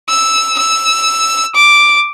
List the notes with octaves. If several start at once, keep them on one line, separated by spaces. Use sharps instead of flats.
E6
E6
D6